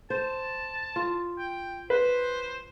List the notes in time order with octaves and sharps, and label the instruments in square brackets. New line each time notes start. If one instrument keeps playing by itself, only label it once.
[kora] C5 [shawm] A5
[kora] F4
[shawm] G5
[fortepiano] B4 [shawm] C5